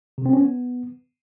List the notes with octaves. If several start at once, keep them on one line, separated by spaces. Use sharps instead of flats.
C3
C4
C#4
B3